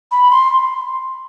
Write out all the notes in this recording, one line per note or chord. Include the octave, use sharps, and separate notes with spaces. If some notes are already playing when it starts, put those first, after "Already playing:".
B5
C6